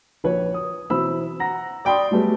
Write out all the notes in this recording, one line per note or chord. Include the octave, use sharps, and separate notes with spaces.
A#1 B4 C#5
D#6
B2 E3 C4 E4 B5 E6
F#5 A#5 A#6
D5 G5 B5 C6 D#6
F#3 G3 A3 B3 G#4